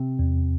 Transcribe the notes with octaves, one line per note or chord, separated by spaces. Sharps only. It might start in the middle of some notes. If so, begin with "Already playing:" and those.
Already playing: C3 C4
E2